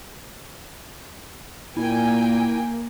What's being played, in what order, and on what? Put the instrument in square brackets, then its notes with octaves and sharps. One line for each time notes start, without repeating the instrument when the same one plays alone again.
[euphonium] A#2 [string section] A#3 [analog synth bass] E4 [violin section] G5 G#5